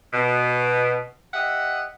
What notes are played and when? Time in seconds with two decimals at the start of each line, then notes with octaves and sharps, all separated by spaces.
0.14 B2
1.34 G4 D#5 E5 F#5